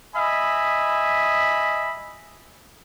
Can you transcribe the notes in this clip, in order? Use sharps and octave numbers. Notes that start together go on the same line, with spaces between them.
D#5 E5 G#5 B5